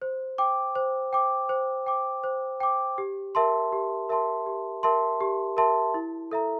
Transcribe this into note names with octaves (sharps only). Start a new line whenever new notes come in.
C5
G5 D6
C5
G5 D6
C5
G5 D6
C5
G5 D6
G4
A#4 E5 A5 C6
G4
A#4 E5 A5 C6
G4
A#4 E5 A5 C6
G4
A#4 E5 A5 C6
E4
A4 E5 A#5